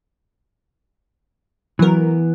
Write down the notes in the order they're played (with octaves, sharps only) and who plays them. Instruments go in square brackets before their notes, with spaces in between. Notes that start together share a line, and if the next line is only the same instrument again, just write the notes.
[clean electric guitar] E3 B3 [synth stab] F#3 A#4